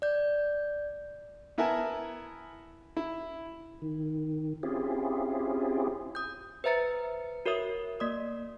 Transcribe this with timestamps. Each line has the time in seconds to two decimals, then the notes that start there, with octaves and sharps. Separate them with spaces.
0.02 D5 G6
1.58 B3 E4 A#4 E5 G#5 A5
2.97 E4
3.82 D#3
4.63 C4 C#4 E4 F4 G4 G#4
6.15 D#6 G6
6.64 B4 C5 E5 A#5 A6 C#7
7.46 F#4 A#4 C#5 E5 D#6
8.00 A#3 D5 D#6